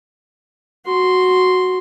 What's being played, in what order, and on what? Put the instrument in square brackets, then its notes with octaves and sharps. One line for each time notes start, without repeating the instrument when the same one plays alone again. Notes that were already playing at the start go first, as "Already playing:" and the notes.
[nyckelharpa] F#4 C6